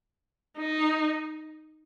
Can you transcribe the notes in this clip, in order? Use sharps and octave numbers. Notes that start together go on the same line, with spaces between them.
D#4